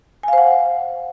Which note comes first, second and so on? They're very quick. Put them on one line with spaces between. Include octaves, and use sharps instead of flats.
G#5 F5 C5 F#5